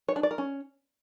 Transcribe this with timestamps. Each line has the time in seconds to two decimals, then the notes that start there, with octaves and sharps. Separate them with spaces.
0.08 C#5
0.16 D4
0.23 D5
0.31 A#4
0.38 C#4